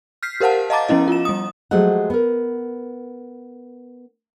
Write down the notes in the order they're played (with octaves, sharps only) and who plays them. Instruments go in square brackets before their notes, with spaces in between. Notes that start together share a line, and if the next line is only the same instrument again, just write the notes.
[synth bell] F6 G6 B6 C7
G4 A#4 C5 F5 F#5 A5
D#5 F5 A5 A#5 D6 A6
F3 B3 C#4 E4 D#5
F4 E7
G3 D#6
[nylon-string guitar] F3 F#3 G#3 A3 G4 F#5
B3 A#4